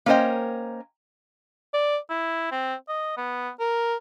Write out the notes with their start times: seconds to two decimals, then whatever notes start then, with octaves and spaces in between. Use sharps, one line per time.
0.06 A#3 C#4 A#4 C5 D#5 G5
1.74 D5
2.10 E4
2.52 C4
2.88 D#5
3.17 B3
3.60 A#4